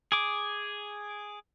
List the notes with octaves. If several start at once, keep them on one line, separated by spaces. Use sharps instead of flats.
G#4 D6